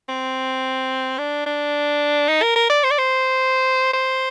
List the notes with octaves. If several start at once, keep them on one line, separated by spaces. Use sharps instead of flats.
C4
D4
D4
D#4
A#4
A#4
D5
C5
D5
C5
C5